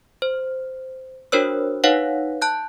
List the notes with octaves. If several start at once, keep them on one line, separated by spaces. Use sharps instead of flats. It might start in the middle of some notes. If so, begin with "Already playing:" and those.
C5
D4 F#4 A#4 C5 C#5 E6
D#4 B4 C#5 F5 F#5
A5 F#6 G6